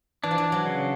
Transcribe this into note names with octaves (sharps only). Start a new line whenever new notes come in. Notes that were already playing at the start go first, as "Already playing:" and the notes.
E3 D4
F3
E3
F#3
C#3